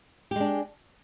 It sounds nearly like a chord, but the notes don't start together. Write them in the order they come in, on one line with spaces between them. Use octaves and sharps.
G4 G#3 D4